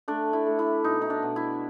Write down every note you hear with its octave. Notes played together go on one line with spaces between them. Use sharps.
A3 D4
E4
A3
E4
B2 D#4
D#4
D4
B2
E4